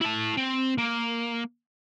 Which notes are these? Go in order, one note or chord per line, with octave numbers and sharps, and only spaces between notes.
E4 A5
C4
A#3